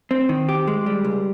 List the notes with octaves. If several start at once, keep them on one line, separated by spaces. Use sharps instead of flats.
C4
D#3
G4
G#3
G3
C#2